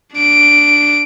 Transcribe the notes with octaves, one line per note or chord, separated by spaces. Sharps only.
D4 D7